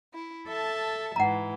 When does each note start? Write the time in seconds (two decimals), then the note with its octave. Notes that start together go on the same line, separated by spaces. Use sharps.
0.13 E4
0.47 A4 E5 A5
1.16 G#2 E3 F#5 A#5